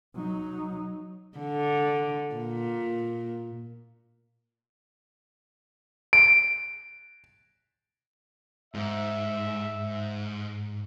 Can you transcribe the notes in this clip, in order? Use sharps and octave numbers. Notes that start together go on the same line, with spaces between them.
F#3 D#4
D3
A#2
D7
G#2 E5